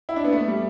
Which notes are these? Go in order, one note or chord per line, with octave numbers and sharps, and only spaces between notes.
E4
D4
B3
A3
G3